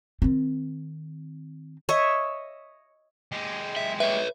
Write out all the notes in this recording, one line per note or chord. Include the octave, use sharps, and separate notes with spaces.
D#3 C4
C#5 D#5 E5
G#3 G4
E5
B4 C#5 E5